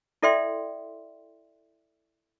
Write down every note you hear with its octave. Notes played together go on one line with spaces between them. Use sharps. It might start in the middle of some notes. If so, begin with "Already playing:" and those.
E4 A4 D5 E5 G5 C6